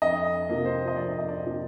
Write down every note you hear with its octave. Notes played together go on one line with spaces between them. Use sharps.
F2 D#5
C3 F3 A#3
C5
D#5
F2 D5
D#5
D5
C3 F3 A#3